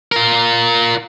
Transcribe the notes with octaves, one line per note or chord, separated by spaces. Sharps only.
F4 A#4